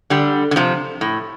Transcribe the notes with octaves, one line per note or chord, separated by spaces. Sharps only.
D3 G3
D3
C3 F3
A2